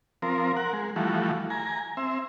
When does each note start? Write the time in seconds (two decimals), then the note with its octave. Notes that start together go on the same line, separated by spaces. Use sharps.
0.22 F3 C4 A#4
0.57 A#4 F#5
0.73 G#3
0.96 E3 F3 G3 A3 F#4
1.50 G#5 A#5
1.97 C4 E5